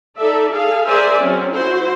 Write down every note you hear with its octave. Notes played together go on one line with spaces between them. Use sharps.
D#4 A4 D5 E5
G#4 A4 F5
G#4 A#4 C5 D5 E5 G#5
F#3 C4 C#4
E4 F#4 C5